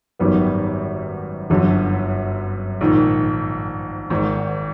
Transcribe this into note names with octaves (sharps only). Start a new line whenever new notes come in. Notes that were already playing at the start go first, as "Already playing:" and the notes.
G#1 F#2 D#3 G3 B3
G1 F#2 D3
A#1 G#2 D#3
G#1 G#2 D#3